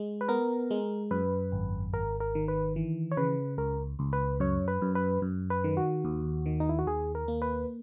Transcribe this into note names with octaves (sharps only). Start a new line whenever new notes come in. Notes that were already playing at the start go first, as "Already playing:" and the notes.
Already playing: G#3
B4
B3 A#4
G#3
F#2 B4
G#1
G#1 A#4
A#4
D#3
B4
E3
C#5
C#3 B4
C#2 A#4
C#2
B4
F#2 C#5
B4
F#2
B4
F#2
B4
D#3
F#4
D#2
D#3
D#4
E4
F#4
D#2 G#4
A#4
A#3
B4